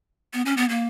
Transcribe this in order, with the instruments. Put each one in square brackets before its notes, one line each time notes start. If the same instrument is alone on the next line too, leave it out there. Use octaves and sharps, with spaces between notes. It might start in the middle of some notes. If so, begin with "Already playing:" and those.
[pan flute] B3
C#4
B3
A#3